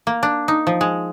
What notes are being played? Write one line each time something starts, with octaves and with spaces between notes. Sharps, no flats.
A#3
D4
D#4
F3
G#3